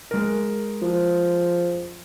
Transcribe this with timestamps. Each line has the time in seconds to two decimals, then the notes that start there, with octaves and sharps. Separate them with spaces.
0.11 G#3 A#4
0.82 F3